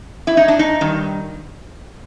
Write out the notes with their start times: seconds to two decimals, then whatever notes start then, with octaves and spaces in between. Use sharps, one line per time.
0.27 E4
0.37 D#4
0.48 D4
0.59 D#4
0.81 G2 D#3